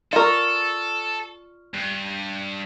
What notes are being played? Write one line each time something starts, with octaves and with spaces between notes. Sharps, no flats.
F4 A4 A#4 D5 C#6
G2